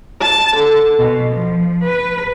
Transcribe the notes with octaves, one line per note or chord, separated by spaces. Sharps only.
A5
D3
B2
F3
B4